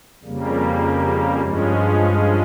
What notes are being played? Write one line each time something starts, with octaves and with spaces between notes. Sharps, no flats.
F2 C#3 G3 A#3
G2 F3 G#3 C#4